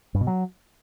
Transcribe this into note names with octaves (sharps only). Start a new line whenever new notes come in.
G2
B2
F#3